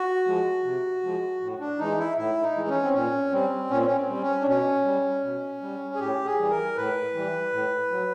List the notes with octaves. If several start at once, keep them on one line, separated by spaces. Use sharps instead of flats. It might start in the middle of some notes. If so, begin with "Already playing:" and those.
Already playing: F#4
F3 G#3
C3
F3 G#3
A2
D4
E3 G#3 D#4
E4
A2 E4
D#4
E3 G#3
C#4
C4
A#2 C#4
G3 C4
A#2 C#4
C4
C#4
C4
G3
C#4
D4
B2 C#4
G3
B2
G3
G#4
A2 G4
G#4
E3 G3
A#4
A2 B4
E3 G3
A2
F#3